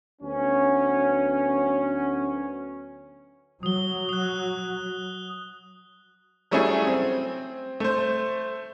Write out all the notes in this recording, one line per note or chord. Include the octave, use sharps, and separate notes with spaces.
D2 F#3 B3 C#4
F#3 D#6 G7
D#6 F#6
F#3 G3 A3 C#4 E4 G#4
C4
A3 C5